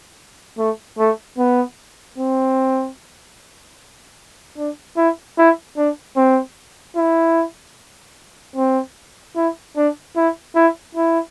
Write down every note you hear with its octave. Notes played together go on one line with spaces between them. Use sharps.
A3
A3
B3
C4
D4
E4
E4
D4
C4
E4
C4
E4
D4
E4
E4
E4